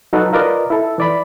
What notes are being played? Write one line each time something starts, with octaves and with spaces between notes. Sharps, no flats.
F#3 D#4 F#4 A4 B4
F4 A#4 B4 D5 D#5
E4 A4
E3 D5 B5